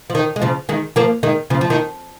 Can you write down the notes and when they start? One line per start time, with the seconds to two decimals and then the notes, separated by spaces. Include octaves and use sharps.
0.10 F3
0.15 D#3
0.36 G#3
0.42 C#3 F3
0.69 D#3 G#3
0.96 F3 A#3
1.23 D#3 G#3
1.50 C#3 F3
1.61 F3
1.70 D#3